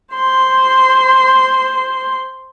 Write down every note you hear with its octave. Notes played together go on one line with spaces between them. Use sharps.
C5 C6